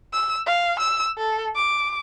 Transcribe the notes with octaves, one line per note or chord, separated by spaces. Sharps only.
E6
F5
E6
A4
D6